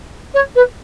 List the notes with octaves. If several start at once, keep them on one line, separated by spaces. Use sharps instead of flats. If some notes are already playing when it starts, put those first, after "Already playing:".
C#5
B4